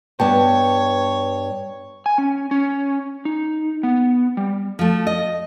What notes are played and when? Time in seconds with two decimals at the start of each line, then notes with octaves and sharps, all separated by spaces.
0.20 G2 B3 C#5 G5 A5
2.06 G#5
2.18 C#4
2.51 C#4
3.25 D#4
3.83 B3
4.37 G3
4.79 F3 A3
5.07 D#5